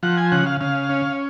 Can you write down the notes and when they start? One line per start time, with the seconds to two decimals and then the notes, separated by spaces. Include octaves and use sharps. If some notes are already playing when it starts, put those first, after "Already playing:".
0.03 F3 F#5
0.17 G#5
0.32 C#3 F#5
0.46 F5
0.61 C#3 F5
0.89 C#4